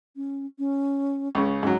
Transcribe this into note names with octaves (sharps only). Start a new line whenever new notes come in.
C#4
C#4
C#2 C#3
G#2 F#3 C#4